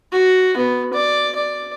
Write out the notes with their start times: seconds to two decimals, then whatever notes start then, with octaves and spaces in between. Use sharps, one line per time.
0.12 F#4
0.57 B3
0.93 D5
1.36 D5